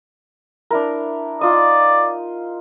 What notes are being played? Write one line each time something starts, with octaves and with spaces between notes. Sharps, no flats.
D4 E4 A#4
D#4 F4 D5 D#6